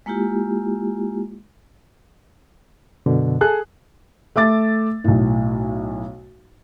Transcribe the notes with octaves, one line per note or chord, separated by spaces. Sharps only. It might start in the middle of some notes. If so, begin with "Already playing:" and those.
G#3 A#3 E4 F4 G4
F#2 B2 D3
G#4 A4 F#6
A3 E5 D6 A6
B1 A2